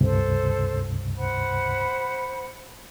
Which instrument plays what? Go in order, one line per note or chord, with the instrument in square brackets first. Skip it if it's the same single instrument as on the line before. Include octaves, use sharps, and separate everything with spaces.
[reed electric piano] C#2 G2 C3 [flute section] A4 C5
[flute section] C5 F#5 B5